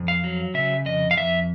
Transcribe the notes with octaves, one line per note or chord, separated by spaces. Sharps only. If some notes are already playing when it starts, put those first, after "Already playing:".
Already playing: F2
F5
F#3
C#3 E5
F2 D#5
F5
F2 E5